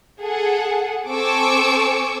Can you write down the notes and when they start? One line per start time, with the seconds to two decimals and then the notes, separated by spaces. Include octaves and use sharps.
0.21 G#4 A4 F#5
1.08 C4 A4 G#5 C#6 D6 E6